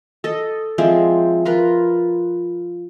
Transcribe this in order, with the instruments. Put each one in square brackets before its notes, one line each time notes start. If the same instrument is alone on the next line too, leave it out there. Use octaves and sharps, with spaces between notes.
[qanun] A4 D#5
F3 G#3 C4 E4
F4 A#4 B4